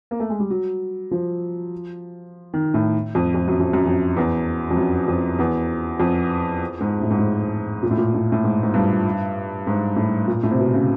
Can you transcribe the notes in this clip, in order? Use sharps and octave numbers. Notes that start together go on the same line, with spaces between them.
A#3
A3
G#3
G3
F#3
F3
D#3
A2
F2
F2
F#2
F2
F#2
F2
E2
F2
F#2
F2
E2
F2
G#2
A2
G#2
A2
A#2
A2
A#2
A2
A2
G#2
G#2
G2
G#2
A2
A#2
A2
C3
B2
C#3